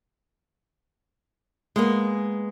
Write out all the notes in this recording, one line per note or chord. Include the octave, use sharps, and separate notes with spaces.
G#3 A#3 B3